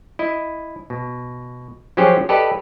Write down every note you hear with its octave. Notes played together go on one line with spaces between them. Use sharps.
E4 D#5
B2
F3 F#3 C#4 G4 G#4 C5
G4 A4 B4 D5 D#5